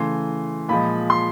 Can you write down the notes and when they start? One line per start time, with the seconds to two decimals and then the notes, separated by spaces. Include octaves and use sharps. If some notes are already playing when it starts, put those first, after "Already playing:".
Already playing: C#3 E3 A3 C6
0.68 A#2 F3 G#3 B5
1.10 C6